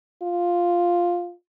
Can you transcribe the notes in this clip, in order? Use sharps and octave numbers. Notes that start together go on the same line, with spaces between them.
F4